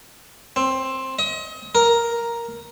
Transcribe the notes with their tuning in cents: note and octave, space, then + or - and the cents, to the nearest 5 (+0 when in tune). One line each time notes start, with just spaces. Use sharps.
C4 +15
D#5 +35
A#4 +5